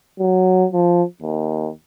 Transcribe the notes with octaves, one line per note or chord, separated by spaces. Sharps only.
F#3
F3
D#2